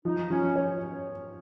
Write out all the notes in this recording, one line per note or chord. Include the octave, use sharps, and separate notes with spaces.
F3 D#4
F3 C#4
C#5